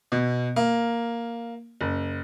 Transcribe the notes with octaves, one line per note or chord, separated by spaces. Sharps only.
B2
A#3
F#1